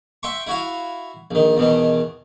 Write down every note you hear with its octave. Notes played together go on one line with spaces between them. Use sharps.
E5 G5 C6 C#6
E4 F#4 F5
A#1 D#3
E2 B2 D#3